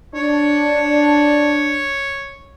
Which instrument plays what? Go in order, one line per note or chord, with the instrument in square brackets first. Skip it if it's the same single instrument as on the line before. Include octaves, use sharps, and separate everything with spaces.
[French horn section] D4 [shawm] C#5